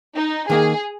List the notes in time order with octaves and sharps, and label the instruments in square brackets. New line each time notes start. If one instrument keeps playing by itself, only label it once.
[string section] D#4
[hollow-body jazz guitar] D#3 A#3 D#4 [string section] G#4